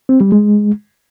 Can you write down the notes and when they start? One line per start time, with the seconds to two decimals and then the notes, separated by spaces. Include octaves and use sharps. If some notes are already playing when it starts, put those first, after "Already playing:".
0.09 C4
0.21 G3
0.32 G#3